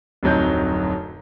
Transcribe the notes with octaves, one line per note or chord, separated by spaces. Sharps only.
D1 F2 F#3 D#4 G6